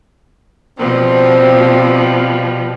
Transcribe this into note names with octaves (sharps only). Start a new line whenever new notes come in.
B2 F3 G3 C4